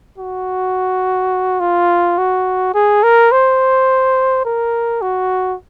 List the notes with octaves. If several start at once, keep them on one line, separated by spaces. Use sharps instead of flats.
F#4
F4
F#4
G#4
A#4
C5
A#4
F#4